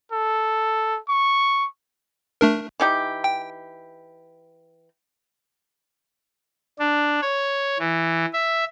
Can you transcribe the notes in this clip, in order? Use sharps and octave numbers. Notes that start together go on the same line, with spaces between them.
A4
C#6
A3 D4 A#4
E3 D#4 G4
G5
D4
C#5
E3
E5